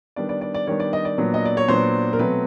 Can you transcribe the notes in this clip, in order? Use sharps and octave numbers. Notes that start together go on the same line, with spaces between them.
D#3 G3 B3 D4 D5
D5
D5
D5
D#3 G3 B3 D4 C#5
D5
D#5
D5
A#2 F#3 B3 D4
D#5
D5
C#5
A#2 F#3 B3 D4 C5
A#4
B2 F#3 A3 C4 B4